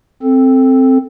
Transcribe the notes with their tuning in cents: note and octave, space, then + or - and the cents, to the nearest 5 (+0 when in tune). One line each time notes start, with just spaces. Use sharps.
C4 +0 A4 +0